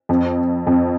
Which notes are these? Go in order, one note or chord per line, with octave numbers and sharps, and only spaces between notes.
F2
F2